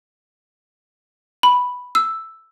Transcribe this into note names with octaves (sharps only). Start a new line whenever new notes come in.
B5
E6